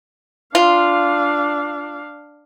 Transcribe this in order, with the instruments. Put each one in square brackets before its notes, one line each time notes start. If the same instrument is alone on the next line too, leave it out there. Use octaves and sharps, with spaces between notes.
[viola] D4 F5 [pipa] F4